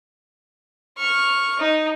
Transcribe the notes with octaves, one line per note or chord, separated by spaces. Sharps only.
C#6 F6
D#4